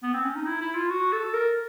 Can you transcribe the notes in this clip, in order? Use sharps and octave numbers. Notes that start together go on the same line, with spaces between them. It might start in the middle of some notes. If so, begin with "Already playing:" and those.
B3
C4
C#4
D#4
E4
E4
F4
F#4
A4
A#4